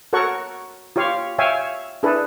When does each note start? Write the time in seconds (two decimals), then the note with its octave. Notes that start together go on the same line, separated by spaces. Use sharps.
0.13 F#4 A4 A#4 C#5 F#5 C#6
0.96 F4 G4 C#5 F5
1.39 C#5 E5 F5 G5 G#5
2.03 D4 E4 G#4 A4 B4